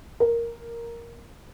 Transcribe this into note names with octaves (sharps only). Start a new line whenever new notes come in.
A#4